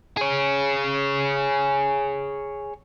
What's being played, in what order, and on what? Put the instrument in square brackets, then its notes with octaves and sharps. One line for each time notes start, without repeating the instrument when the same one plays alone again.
[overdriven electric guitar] G#4 C#5